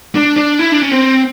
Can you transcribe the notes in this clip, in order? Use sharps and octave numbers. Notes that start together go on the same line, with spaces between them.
D4
D4
E4
D4
C#4
C4